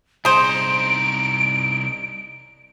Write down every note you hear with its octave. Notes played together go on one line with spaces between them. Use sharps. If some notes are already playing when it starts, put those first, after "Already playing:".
C2 D#4 G#4 C5 D7